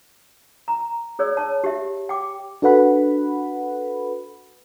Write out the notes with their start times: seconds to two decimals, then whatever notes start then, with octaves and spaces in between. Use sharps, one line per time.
0.68 A#5
1.19 G#4 C#5 D5 E6
1.37 C#5 A5
1.64 G4 E5
2.09 G5 D6
2.62 D4 F#4 A4 B4 F#5 B5